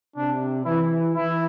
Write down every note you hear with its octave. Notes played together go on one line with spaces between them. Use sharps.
C3 D4
E3 E4
E3 E4